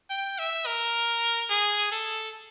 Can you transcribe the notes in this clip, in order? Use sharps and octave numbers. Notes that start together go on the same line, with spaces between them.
G5
E5
A#4
G#4
A4